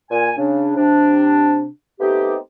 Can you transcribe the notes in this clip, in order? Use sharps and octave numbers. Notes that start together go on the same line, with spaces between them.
A#2 G#5
C#3 D4
C3 D4
A3 B3 C4 D#4 G4